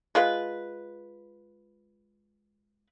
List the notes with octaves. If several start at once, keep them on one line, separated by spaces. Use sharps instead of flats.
G#3 F4 B4